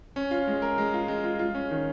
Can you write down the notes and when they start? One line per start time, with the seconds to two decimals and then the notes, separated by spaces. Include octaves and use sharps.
0.16 C#4
0.31 F4
0.48 G#3
0.62 A#4
0.78 G#3
0.94 F4
1.08 G#3
1.24 F4
1.39 F4
1.55 C#4
1.71 D#3